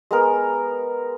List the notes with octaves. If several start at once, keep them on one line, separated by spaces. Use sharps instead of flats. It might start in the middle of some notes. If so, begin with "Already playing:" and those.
G#3 B3 A#4